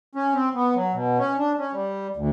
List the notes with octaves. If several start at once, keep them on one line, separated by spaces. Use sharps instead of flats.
C#4
C4
B3
F#3
B2
C#4
D4
C#4
G3
D2